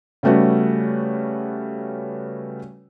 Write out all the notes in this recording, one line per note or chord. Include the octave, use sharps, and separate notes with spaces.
C#3 G3 A3 B3 F#4